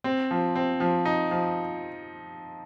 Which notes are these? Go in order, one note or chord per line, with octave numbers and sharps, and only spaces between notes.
C4
F3
C4
F3
D#4
F3